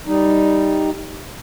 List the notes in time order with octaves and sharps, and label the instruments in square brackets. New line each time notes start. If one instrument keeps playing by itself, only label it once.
[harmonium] G3 D#4